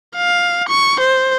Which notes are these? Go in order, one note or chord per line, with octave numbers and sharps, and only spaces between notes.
F5
C#6
C5